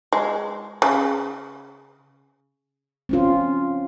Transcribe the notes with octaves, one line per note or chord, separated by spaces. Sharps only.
G#3
C#3
C4 C#4 F4